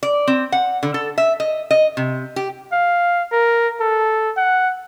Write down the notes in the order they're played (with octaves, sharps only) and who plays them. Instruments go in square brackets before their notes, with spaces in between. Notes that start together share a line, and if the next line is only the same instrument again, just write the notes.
[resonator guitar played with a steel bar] D5
C4
F#5
D3
A4
E5
D#5
D#5
C3
G4
[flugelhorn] F5
A#4
A4
F#5